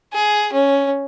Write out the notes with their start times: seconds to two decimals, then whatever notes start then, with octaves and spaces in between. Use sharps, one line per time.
0.13 G#4
0.52 C#4